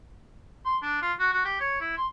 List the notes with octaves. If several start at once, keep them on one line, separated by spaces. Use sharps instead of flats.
C6
D4
F4
F#4
F#4
G4
C#5
E4
C6